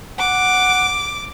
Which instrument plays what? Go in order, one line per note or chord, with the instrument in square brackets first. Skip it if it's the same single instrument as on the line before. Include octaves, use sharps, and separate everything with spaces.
[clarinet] F#5 [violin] D6